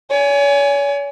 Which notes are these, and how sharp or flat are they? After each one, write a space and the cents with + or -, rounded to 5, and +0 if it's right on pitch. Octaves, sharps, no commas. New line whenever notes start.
C#5 +40 G#5 +0